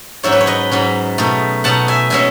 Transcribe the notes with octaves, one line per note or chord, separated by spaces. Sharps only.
G#2 F#3 C#4 C#5 E5
B4
C#5
B4 D#5
G#2 F#3 C#4
B2 A3 D#4
B2 A3 D#4 F#5 A5
E5 G#5
B2 G#3 C#4 E5 G#5